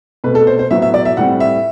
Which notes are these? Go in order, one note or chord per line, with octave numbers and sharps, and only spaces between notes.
B2 A3 C4 B4
A4
C5
C5
A2 F#3 B3 E5
E5
D5
E5
A2 G3 C4 F#5
E5